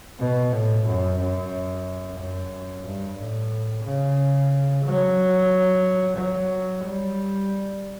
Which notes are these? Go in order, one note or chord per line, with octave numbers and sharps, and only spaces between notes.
B2
A2
F#2
F#2
F#2
G2
A2
C#3
F#3
F#3
G3